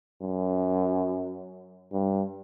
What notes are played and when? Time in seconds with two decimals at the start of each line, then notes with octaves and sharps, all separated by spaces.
0.22 F#2
1.93 G2